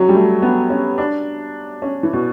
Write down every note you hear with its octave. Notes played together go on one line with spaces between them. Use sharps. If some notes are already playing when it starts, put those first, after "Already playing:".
Already playing: F#3 C#4
G3
A3
B3
C#4
D4
C#4
E3
B2